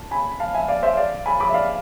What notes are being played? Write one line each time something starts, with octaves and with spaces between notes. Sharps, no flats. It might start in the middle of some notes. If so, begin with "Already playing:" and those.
Already playing: A5
G#5 B5
F5 A5
E5 G#5
D5 F5
C5 E5
D5 F5
G#5 B5
B5 D6
E5
D5 F5